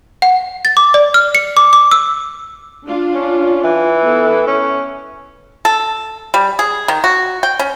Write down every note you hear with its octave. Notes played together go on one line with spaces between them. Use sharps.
F#5
A6
D6
D5
F6
C#7
D6
D6
E6
D4 F4
C#4
E3
B3 E4 A4
C#4
A4
G3
G#4
D#3
F#4
G5
C#4